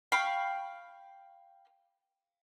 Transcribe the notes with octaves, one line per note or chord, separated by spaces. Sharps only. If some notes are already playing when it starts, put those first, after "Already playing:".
F5 G5 B5 C#6